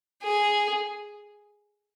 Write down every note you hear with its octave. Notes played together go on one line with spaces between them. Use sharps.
G#4